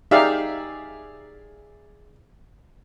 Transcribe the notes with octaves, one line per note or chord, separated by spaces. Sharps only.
D#4 G4 G#4 D5 E5 F5